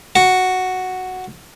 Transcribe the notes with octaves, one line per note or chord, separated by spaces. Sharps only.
F#4